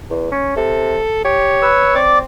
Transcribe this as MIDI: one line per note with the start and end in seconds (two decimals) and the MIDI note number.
0.11 0.30 40
0.31 0.55 61
0.57 0.99 48
0.57 1.21 69
1.25 1.69 67
1.25 2.00 73
1.62 1.94 71
1.62 1.94 88
1.95 2.25 60
1.95 2.19 74
1.95 2.19 86